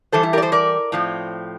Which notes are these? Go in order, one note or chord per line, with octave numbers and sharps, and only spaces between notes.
E3 G3 A4 C5
E4
G4 A#4
D5
A4 C5
A#4 D5
A2 F3 C4